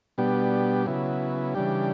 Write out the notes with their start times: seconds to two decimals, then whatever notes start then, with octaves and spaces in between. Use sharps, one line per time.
0.18 B2 G3 B3 D4 G4
0.86 C#3 F#3 B3 E4
1.55 C#3 E3 G3 D4 G4